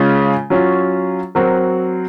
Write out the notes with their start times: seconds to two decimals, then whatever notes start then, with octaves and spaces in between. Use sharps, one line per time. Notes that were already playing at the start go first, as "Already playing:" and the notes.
Already playing: C#3 G#3 C#4 F4
0.50 F#3 C#4 F4
1.35 F#3 C4 F#4 A#4